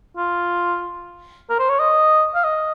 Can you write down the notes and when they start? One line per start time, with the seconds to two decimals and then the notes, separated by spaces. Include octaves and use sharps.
0.17 F4
1.50 A#4
1.59 C5
1.69 C#5
1.80 D#5
2.35 F5
2.44 D#5